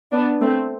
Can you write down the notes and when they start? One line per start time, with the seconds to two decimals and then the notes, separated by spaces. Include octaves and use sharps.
0.12 B3 D4
0.40 A3 C4